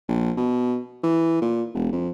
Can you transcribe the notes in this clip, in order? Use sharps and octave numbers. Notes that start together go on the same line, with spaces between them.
A#1
B2
E3
A#2
E1
F2